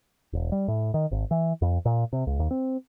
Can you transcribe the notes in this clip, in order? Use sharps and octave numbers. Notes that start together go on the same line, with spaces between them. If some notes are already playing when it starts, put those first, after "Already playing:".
E1
G3
A2
D#3
G#1
E3
F2
A#2
C3
C#2
D#2
C4